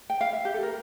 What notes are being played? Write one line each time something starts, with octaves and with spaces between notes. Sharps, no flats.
G5
F5
E5
G4
A4
A#4